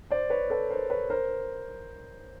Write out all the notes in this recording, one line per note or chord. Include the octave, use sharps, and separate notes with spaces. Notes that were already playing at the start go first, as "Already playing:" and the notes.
C5 D5
B4 C#5
A4 B4
A#4 C5
B4 C#5
A#4 C5